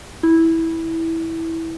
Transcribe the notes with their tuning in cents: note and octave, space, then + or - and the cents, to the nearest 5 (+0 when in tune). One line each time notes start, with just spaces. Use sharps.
E4 -10